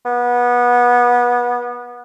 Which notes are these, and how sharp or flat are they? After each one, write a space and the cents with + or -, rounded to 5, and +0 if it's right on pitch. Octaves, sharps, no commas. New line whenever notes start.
B3 -25